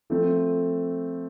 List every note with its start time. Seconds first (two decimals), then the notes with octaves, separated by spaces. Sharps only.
0.10 F3 A3 C4